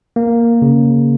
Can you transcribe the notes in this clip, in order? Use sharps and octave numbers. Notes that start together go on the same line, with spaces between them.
A#3
C#3